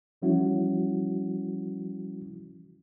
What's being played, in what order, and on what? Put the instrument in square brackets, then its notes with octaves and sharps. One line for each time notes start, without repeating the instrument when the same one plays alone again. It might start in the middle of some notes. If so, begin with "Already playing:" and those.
[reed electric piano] E3 F3 G3 C#4 E4 F#4